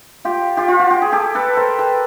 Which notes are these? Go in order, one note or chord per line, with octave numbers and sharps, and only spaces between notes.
F4 G4
F4 G4
F4
F#4
G4
G#4
G4 A4
A4 B4
A#4 C5
A4 B4